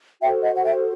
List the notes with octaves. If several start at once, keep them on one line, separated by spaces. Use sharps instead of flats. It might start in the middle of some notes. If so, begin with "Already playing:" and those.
F#4 A4 C5 E5 G5
D#5 F#5
F#5
E5 G5